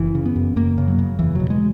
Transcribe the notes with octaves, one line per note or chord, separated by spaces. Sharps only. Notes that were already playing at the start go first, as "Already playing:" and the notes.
Already playing: F#1 E3
C#3
B3
F#2
F#2 A#3
C#3
F#3
C#3
E2 E3
B2 F#3
G#3